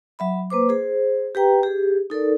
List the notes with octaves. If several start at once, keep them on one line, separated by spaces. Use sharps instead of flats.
F#3 E5 B5
A#3 B4 C5 D6
G#4 C5
G4 B4 G5 A#5
G4 G#4
D#4 A4 A#4 D5